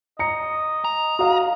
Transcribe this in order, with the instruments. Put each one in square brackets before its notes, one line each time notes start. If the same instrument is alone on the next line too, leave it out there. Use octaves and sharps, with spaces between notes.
[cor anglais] D#5 [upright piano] A#5 C#7
[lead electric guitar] A#5
[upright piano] F#4 F5 [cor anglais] D#5